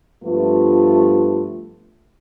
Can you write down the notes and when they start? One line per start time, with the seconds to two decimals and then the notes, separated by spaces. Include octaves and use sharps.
0.24 G2 F3 A3 B3 F4